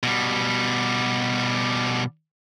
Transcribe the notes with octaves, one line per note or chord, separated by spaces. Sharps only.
B2 G3